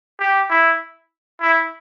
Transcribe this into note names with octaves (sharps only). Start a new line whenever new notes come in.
G4
E4
E4